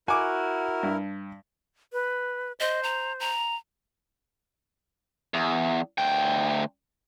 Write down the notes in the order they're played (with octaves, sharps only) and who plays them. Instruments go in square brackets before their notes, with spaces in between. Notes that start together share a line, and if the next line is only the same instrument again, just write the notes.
[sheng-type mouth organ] E4 A#4 [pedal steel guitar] F#4 [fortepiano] G#5 D6
[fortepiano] G2
[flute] B4
[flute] C5 [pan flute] D#5
[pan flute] A#5
A#5
[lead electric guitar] E2
D2 G5